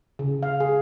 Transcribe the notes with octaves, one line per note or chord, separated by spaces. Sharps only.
C#3
F5
G#4